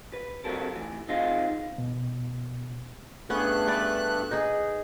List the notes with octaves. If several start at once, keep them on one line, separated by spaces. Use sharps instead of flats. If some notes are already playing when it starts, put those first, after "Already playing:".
B4
F#3 C4 G4 A4 A#4
A2 E3
C4 D#4 F4 G#4 F5
B2
G2 A3 B3 C#4 G#4 F#6
D4 B4 D5
D#4 G#4